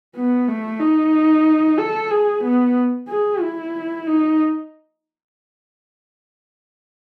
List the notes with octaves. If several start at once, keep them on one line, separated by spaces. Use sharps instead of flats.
B3
A3
D#4
A4
G#4
B3
G#4
E4
D#4